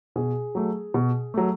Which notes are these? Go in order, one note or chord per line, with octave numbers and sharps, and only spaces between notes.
B2 G#4
F#3 A3
B2
F#3 A3